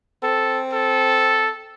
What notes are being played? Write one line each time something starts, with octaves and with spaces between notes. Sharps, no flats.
C4 A4
A4